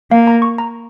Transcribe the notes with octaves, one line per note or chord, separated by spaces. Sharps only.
A#3 F5
A#5
C#6
A#5